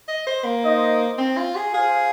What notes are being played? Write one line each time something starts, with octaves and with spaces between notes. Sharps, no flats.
D#5
C5
A#3
D#4 C5 D#5
C4
F4
G#4
F4 G#4 C5 F5